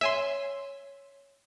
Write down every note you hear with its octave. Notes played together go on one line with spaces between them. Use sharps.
C#5 E5 G#5 C6